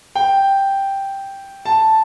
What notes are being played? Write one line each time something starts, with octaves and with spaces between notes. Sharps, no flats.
G5
A5